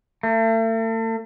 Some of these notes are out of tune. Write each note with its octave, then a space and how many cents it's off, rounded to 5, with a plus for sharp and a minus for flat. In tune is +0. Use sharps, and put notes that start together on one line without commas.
A3 +40